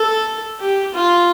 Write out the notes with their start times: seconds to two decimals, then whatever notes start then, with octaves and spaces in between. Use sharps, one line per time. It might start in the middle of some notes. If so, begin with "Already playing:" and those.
Already playing: A4
0.60 G4
0.94 F4